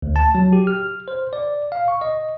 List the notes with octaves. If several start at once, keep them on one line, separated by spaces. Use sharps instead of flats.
D2
A5
F#3
G4
F6
C5
D5
F5
C#6
D#5